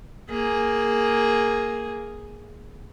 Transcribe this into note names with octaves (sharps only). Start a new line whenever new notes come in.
A#3 G#4